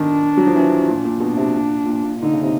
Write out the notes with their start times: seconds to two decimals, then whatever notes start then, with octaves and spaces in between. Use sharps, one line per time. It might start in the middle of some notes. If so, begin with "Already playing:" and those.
Already playing: D#3 D4
0.37 F#3
0.47 F3
0.55 E3
0.88 A#2
1.05 A#2
1.20 B2 D4
1.37 C3
1.54 A#2
1.86 A#2
2.04 A#2
2.20 D3 D#4
2.33 C#3
2.43 C3